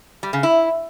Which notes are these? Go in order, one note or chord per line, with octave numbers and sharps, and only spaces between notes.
G3
C#3
E4